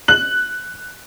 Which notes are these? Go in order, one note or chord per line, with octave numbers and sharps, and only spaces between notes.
F#6 F#7